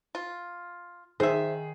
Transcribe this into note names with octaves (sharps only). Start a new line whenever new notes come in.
F4
D#3 G#4 C5 E5